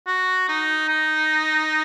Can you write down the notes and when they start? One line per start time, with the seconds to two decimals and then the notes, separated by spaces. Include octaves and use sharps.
0.07 F#4
0.48 D#4
0.88 D#4